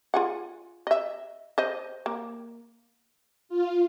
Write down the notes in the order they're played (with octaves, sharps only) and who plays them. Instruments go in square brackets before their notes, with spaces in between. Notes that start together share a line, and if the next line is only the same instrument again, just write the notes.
[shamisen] F4 G#4 F#5
D#5 E5
C5 D#5
A#3
[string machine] F4